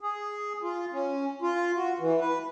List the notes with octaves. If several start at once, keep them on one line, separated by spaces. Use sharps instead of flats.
G#4
F4
C#4
F4
F#4
E3
B4